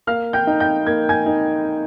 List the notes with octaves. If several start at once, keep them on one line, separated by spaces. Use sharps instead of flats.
A#3 F5 F6
G5 G6
D#4
G5 G6
A#3 G#6
G#5 G#6
D#4